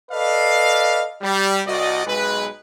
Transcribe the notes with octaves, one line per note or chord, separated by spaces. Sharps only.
A4 B4 D5 D#5 F5
G3
C2 F#4 D5 D#5
B1 G#3 B4